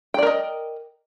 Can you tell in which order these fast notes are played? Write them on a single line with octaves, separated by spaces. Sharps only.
G5 D5 A#4 D#5